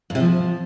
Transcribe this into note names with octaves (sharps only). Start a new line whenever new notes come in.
G2
C3
F3